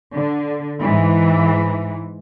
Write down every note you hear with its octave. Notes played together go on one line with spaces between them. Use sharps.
D3
G#2 E3